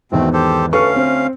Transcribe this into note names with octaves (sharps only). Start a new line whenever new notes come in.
G#1 E2 B2 A3 C4
G4 A4 C5
D2 C#4 A4 B4 F5 C#6
C4